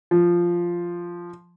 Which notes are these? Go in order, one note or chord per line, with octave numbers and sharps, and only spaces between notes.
F3